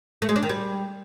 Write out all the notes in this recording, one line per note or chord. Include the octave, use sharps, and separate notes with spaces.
A3
G#3
D4
D#3
G3